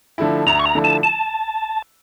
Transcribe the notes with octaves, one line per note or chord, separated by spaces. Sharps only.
D3 F3 A3 E4
D2 A#5
C#6
A#5
D3 F3 A3 E4
A5
A5